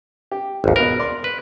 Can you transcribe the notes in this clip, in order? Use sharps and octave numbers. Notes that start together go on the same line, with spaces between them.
G4
G#1 D#2
B2 A#4 B4
D5 C6
B4